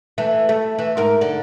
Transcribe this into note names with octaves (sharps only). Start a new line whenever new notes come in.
E3 A3
A3
E3
G#2 A#4
D3